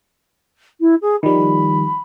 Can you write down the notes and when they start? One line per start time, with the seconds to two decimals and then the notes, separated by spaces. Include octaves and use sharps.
0.81 E4
1.02 G#4
1.23 D#3 F3 G3 B5